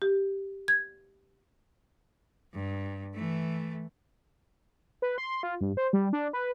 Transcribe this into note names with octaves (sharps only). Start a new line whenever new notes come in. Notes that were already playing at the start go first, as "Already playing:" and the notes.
G4
G#6
G2
E3 A3
B4
C6
F4
G2
C5
G3
D4
B4